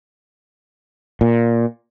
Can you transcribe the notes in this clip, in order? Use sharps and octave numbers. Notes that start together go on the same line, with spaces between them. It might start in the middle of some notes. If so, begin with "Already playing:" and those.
A#2